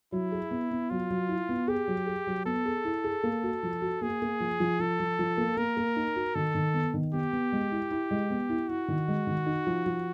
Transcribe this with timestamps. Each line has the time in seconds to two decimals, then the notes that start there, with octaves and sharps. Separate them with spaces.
0.12 F#3 E4
0.32 G#4
0.51 B3
0.71 B3
0.90 F#3 F4
1.10 F#3
1.29 E4
1.49 B3
1.68 G4 G#4
1.88 F#3
2.07 G#4
2.27 F#3
2.46 B3 A4
2.66 G#4
2.85 E4
3.04 G#4
3.23 A#3
3.44 F#4
3.63 F3
3.82 F#4
4.01 A#3 G#4
4.22 A#3
4.40 F3
4.60 F3
4.80 F3 A4
5.00 F3
5.19 F3
5.38 A#3
5.57 A#3 A#4
5.77 A#3
5.96 D#4
6.16 F#4
6.35 D#3 A4
6.55 D#3
6.74 B3
6.94 D#3
7.13 B3 G4
7.33 B3
7.52 G#3
7.72 E4
7.91 E4
8.11 G#3
8.30 B3
8.49 E4
8.69 E4 F#4
8.88 D#3
9.08 G#3
9.27 D#3
9.46 D#4
9.67 F3
9.86 F3